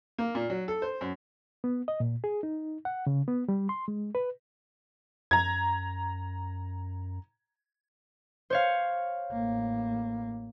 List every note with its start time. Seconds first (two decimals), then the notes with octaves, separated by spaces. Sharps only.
0.18 A#3
0.35 A#2
0.50 F#3
0.68 A4
0.82 C5
1.01 F#2
1.64 B3
1.88 D#5
2.00 A#2
2.24 G#4
2.43 D#4
2.85 F#5
3.07 C#3
3.28 B3
3.49 G3
3.69 C6
3.88 G#3
4.15 B4
5.31 F#2 A#5 G#6
8.50 C5 C#5 F5
9.32 A1 A#3